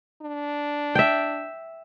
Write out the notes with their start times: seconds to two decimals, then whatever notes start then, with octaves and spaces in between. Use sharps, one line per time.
0.21 D4
0.95 E5 G5